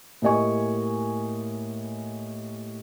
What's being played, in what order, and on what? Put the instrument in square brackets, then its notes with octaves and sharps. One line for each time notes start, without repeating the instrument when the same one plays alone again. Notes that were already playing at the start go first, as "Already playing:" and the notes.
[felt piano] A2 A#3 G4 D#5 G#5 C#6